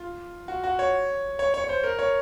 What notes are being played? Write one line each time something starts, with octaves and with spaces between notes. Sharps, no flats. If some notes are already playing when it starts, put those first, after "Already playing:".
Already playing: F4
F#4
F#4
C#5
C#5
C#5
C#5
C5
A#4
C#5